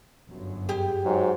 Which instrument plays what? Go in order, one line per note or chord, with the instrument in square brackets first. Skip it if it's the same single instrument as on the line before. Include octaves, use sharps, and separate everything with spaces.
[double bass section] G1 F#2
[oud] G4 G#4
[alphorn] G#2 [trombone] F#3